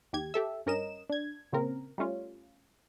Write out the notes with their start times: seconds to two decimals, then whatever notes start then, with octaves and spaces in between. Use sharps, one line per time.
0.13 D#2 G4 G#6
0.34 G4 A4 E5
0.66 G2 C#4 A#4 D#5 E7
1.09 D4 G#6
1.52 A#2 C#3 C4 A#4
1.98 G3 A3 C#4 F4